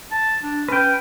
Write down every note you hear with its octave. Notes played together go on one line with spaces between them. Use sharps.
A5
D4
C#4 B4 G5